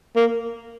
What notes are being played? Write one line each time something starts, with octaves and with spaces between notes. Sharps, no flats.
A#3